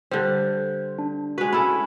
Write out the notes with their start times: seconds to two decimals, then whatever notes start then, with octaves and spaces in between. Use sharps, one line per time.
0.12 D3 G3 C5
0.99 D4
1.38 G#3 F#4 B4
1.53 C#4 E4 A4 B5